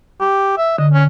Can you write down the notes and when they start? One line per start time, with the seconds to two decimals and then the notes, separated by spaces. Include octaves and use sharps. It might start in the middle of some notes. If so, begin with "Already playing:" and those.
0.21 G4
0.58 E5
0.78 D3 D#5
0.93 C#4